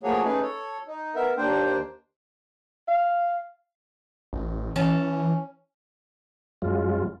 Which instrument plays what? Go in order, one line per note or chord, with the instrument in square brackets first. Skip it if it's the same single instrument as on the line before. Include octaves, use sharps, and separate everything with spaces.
[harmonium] F3 A3 A#3 F#4 G#4 C#5
A3 C#4 D#4 G#4 B4
A4 C#5
D#4
B3 A#4 E5
D#2 A#3 D4 C5 G5
[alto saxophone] F5
[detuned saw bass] A1
[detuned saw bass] E3 [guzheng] C#4 A5
[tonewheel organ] F#2 F#3 G#3 F4